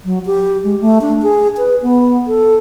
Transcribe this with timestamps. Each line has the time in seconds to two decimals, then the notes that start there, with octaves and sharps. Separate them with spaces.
0.05 F#3
0.26 G4
0.64 G#3
0.81 A3
1.01 D4
1.22 G#4
1.57 B4
1.82 B3
2.27 A4